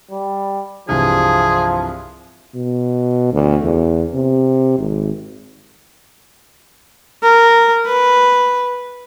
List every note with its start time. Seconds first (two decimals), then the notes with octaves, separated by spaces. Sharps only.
0.11 G3
0.89 C2 G2 E3 F3 G#4
2.55 B2
3.33 D2
3.64 E2
4.15 C3
4.79 G#1
7.23 A#4
7.87 B4